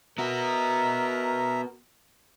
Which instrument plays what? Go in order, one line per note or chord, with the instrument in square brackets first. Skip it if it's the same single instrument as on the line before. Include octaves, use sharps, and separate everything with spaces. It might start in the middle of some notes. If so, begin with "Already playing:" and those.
[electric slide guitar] B3 F#4 [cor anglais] A#4 [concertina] E5 A#5